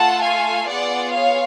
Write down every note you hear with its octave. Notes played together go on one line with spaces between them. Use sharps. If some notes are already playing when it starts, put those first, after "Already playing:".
Already playing: A3 F4 A4 F#5 A5
F5 G#5
B3 F4 G#4 D5 F#5
C#5 F5